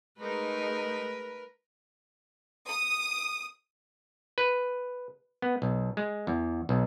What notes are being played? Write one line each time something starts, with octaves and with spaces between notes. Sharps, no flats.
G#3 A3 D#4 A#4 B4
D#6
B4
B3
B1
G#3
E2
B1